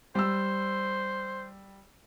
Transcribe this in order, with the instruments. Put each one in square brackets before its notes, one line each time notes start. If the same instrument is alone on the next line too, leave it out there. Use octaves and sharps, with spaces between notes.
[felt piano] G3 E6 [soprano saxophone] C5